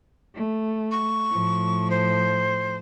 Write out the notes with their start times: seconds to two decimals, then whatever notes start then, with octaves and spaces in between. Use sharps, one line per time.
0.35 A3
0.91 C#6
1.32 A2 F3
1.90 C5